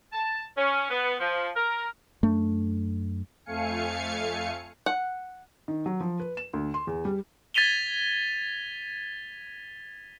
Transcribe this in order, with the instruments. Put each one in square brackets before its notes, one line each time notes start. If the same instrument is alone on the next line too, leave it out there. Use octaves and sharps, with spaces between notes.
[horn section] A5
C#4
B3
F3
A#4
[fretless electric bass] F#2 A3 D4
[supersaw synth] F2 A3 F5 G#5 C#7
[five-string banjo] F#5
[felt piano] D#3
F#3
F3
B4
E7
D2
C6
E2
G3
[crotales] G#6 A6 B6 D#7 F7 G7